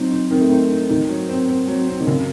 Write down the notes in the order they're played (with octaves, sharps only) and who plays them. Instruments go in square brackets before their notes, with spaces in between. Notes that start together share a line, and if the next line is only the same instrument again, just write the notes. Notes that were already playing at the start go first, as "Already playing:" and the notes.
Already playing: [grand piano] F#3 [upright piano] C4 D#4
[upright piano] D#4
[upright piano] D#3 [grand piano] C4
[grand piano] A3
[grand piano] C4 [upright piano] D#4
[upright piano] D#4
[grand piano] D#3 [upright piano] D#4
[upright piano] F#3
C4
C4
F#3
C4
[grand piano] D#3
[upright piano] F#2 [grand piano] C#3